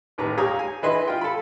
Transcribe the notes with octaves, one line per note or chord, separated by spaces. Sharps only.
A1 D#2 B4 A#5
G4 G#4 C#5 F5 A#5 D#6
G#5
E3 E4 G#4 B4 D#5 C6
F4 G5
A4 B5